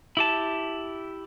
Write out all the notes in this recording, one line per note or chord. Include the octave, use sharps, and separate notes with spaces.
E4 G4 A5